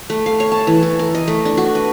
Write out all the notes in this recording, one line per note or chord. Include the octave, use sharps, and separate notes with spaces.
A3
F5
C#5
A5
E3
A4
A#4
D#5
A3
D4
F#4
B4